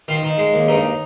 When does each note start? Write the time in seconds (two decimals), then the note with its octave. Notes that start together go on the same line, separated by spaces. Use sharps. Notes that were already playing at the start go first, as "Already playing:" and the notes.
0.08 D#3 F4
0.23 D#3
0.38 G#3
0.54 D#2
0.68 G2 D#4